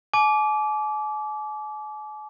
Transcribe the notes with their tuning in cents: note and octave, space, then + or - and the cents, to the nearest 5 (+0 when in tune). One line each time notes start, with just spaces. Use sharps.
G#5 +45 D6 -15